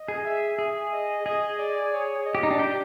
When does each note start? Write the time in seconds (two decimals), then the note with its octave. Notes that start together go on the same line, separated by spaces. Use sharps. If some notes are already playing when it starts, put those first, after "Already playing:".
Already playing: D#5
0.08 G#4
0.25 E5
0.59 G#4 E5
0.93 D#5
1.26 G#4 D#5
1.59 D5
1.93 C#5
2.25 D#5
2.35 G4
2.43 D#4
2.51 D4
2.59 G4